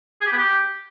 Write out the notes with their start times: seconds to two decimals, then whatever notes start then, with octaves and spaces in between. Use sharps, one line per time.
0.21 G#4
0.26 G4
0.32 B3
0.37 G4